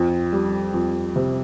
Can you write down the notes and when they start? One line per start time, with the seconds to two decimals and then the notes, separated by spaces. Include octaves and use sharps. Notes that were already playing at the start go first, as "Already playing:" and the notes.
Already playing: F2
0.33 G3
0.74 F2
1.16 C3